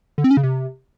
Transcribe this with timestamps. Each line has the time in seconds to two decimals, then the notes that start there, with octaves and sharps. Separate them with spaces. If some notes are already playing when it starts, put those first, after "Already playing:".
0.18 D3
0.24 C4
0.31 C#4
0.37 C#3
0.43 C3